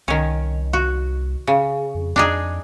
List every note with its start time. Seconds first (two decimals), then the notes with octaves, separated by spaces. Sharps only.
0.08 C2 D#3 C#4
0.73 F#4
1.47 C#3
1.95 F2
2.16 F2 D4 D#4 G#4